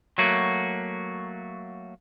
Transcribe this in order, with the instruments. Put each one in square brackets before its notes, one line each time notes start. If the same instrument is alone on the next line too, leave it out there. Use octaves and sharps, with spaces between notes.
[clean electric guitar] F#3 A3 A#3 F#4